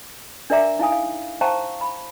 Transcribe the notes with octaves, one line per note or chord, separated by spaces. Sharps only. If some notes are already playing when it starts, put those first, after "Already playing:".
D4 A#4 D5 E5 A#5 D6
D#4 E4 F5 G#5 D#6
F5
C5 F5 G5 A5 A#5 C#6
B5